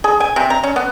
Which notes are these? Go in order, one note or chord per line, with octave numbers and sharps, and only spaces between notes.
G#4
G#5
C3
A#5
C#4
B3